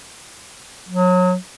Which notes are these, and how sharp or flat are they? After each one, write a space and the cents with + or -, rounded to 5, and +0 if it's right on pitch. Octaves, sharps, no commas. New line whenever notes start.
F#3 -30